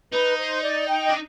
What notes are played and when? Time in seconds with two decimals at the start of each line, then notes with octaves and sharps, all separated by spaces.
0.11 D#4 B4
0.38 C5
0.62 D5
0.88 G5
1.05 D#5
1.09 D4